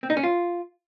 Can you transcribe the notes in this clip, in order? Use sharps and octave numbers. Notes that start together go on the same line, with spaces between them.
C4
D#4
C#4
F4